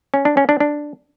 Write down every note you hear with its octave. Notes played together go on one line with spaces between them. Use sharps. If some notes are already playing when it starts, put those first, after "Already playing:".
C#4
D4
C#4
D4
D4